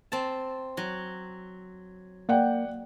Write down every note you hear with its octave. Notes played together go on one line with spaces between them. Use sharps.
C4 A5
F#3
A#3 D5 F#5 G5